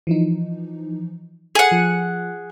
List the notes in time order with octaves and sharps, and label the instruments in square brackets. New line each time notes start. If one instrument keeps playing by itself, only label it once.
[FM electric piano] E3 F3 D#4
[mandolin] G#4 F#5 [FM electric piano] A4
[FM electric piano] F3